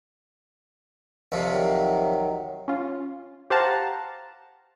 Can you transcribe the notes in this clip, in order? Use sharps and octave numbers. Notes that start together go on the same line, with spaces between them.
C2 F2 C3
D#3 F#3
C#4 F4
G4 C5 F5 F#5 A5 A#5